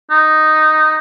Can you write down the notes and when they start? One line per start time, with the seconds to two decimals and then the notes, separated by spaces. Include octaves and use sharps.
0.11 D#4